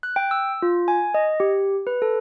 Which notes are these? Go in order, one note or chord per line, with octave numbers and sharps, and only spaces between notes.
F#6
G5
E6
F4
G#5
D#5
G4
B4
A4